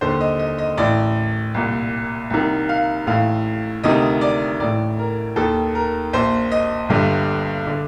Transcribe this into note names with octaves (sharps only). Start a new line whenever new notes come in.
D#2 D3 C5
D#5
D#5
D#5
A1 A2 D5
C2 A#2
C2 C3 D#3
F5
A1 A2 F5
D2 C3 D#3 D#5
D5
A1 A2 D5
A#4
D#2 D#3 A4
A#4
A#1 A#2 C5
D#5
G1 G2 D3
D3